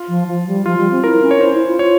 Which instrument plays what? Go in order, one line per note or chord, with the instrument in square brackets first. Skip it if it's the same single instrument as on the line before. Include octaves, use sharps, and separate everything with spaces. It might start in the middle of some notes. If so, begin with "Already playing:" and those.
Already playing: [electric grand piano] F4
[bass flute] F3
F3
G3
[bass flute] F3 [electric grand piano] F4
[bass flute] G3
C4
[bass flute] E4 [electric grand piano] A#4
[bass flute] C#4
[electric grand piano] C#5
[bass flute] E4 [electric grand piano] C5
[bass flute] E4
F4
[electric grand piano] C#5